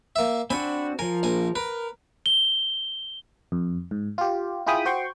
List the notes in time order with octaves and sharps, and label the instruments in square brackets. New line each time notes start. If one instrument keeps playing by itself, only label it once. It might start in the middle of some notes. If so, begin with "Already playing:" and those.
[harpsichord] A#3 E5
[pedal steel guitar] C4 D4 F#4 [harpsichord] G#5 B5
[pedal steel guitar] F3 A#4 [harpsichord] G#5
[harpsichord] A#1 G#5
[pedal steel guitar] A#4 [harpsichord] B4
[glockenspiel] G7
[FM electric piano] F2
G#2
F4 G4
E4 F4 G#4 G5 B5 D#6
F#4 C5 G5 C6 C#6